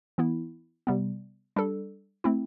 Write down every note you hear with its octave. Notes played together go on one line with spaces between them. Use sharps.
E3 B3 E4
C3 G3 B3
G3 D4 A4
A3 C4 E4